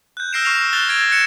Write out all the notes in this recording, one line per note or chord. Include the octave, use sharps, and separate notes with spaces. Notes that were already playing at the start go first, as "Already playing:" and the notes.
F#6 G6
E6 F6 A#6 C7 D7 E7
C#6 F6 C7 F7
F#6 A6 F7 G7
E6 G#6 C7 D7 E7 F7
F#6 A6 C7 C#7 E7